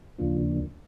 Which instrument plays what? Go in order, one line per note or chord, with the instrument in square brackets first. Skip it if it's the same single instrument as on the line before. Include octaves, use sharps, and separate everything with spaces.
[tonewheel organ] D#2 C#3 F3 A#3 D4 F4